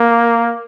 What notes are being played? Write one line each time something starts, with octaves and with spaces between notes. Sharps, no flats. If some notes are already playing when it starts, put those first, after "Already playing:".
Already playing: A#3